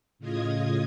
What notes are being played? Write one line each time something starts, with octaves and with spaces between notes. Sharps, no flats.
A2 C#3 F4 D#5 D#6 G#6